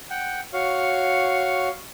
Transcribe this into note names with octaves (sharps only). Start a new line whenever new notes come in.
F#5 G5
F#4 C#5 F5